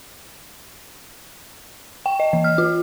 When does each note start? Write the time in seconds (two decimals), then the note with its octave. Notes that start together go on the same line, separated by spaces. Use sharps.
2.06 G5
2.20 D#5
2.33 E3
2.44 F6
2.58 F4